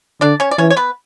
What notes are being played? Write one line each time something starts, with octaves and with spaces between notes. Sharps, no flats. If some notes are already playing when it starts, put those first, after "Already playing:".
D3 D4 D5
C#4 C#5
D5
E3 C#4 C#5
C#5
B3 B4